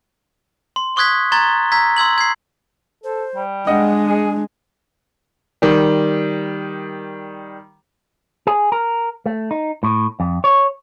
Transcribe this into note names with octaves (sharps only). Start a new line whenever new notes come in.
C6
C6 C#6 D#6 F#6 G#6 B6
A#5 C6 C#6 G#6 A6 G7
A#5 E6 G#6 B6
C6 E6 G#6 F#7
G#6 C7
A4 C5
G3
G#3 D4 D#5 F#5
G#4
D#3 G3
G#4
A#4
A3
D#4
A2
F2
C#5